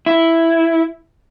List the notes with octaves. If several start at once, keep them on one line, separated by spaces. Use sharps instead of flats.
E4